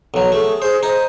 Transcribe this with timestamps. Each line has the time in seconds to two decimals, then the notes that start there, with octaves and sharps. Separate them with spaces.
0.14 B1 F#3
0.32 A3 G#4
0.62 G#4 C5
0.83 D#4 C5